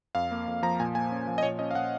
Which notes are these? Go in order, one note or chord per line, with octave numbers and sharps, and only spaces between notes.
F2 F5
A#3
F2
F3 A#5
A#2 G#5
A#3 G#5
C#4
F3
D#5
A#2 C#5
C#4 D#5
F5
A#2 F#5